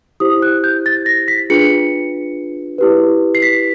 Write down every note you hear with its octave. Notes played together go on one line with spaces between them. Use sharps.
E4 G4 C5 D#6
F#6
G6
A6
A#6
B6
D4 F4 G#4 B4 C#7
E4 G4 B4
C7
B6